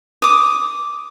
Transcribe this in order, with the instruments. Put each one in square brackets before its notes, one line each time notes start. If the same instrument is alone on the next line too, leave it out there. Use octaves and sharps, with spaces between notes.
[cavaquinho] D6 D#6